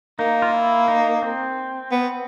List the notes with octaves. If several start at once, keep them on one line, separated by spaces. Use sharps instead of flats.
A#3 D#4
F4
E4
D#4
C4
B3